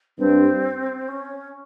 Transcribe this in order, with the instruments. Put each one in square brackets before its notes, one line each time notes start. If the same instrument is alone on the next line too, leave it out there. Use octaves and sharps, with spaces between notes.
[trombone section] G2 [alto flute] C4
[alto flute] C#4